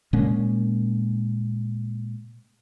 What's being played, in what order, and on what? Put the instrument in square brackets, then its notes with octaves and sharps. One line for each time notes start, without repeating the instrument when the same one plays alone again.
[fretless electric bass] A#2 G#3 A#3 C#4